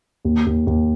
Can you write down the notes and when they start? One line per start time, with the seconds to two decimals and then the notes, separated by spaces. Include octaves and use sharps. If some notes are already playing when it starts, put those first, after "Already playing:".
0.25 D#2
0.46 D#2
0.67 D#2